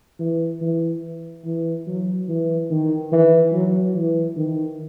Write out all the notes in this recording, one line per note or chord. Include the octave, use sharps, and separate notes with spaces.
E3
E3
E3
F#3
E3
D#3
E3
F#3
E3
D#3